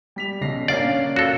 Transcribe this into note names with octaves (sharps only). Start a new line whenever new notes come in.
G3 B6 F7
B1 C#3 A#6 C7
A#3 C#4 D4 D5 F5 C7
F#4 A4